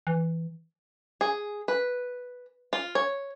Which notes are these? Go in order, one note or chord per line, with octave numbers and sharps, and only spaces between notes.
E3
G#4
B4
F4
C#5